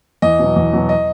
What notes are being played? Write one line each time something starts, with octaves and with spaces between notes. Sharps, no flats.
E2 D#5
B2 F#3
E2
B2 F#3
D#5